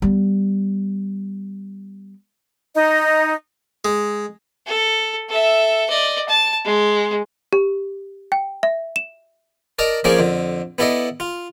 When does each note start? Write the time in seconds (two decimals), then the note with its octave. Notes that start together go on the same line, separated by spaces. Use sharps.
0.02 G3 B3
2.75 D#4 D#5
3.85 G#3
4.67 A4
5.29 A4 E5
5.89 D5 D#5
6.29 A5
6.64 G#3
7.53 G4
8.32 G5
8.63 E5
8.96 E7
9.79 A#4 D5 D#5 A5 A#5
10.04 F3 A#3 C#4 G#4 C#5 D5
10.19 F2 D3
10.78 B3 E4 A4 D5 D#5
11.20 F4